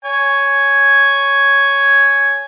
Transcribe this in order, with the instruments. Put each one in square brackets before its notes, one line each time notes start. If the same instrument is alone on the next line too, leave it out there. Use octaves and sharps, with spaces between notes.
[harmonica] C#5 G#5